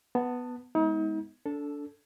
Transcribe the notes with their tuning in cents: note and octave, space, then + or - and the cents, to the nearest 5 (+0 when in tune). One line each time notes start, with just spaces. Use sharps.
B3 +0 A5 +20
G#3 +0 B3 +0 D#4 +40
D4 -25 A4 +0